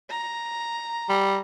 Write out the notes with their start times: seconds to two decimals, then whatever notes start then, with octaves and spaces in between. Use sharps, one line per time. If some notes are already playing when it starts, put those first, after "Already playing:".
0.10 A#5
1.09 G3